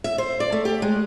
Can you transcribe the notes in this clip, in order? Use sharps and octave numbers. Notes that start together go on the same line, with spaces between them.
E5
C5
D5
A3
G4
G#3